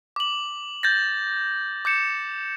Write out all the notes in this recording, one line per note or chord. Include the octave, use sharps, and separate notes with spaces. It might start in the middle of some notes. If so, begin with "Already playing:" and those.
D6 F#7
G6 A6 A#6
D6 G6 C#7 E7